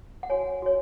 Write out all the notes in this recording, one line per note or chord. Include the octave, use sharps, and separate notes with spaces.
F#5
F#4 C#5 G#5
F#4 C#5